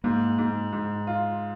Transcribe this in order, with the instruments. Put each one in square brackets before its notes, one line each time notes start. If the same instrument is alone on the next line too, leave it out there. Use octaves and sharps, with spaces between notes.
[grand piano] G#2 [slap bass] A#3
[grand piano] G#2
G#2
F4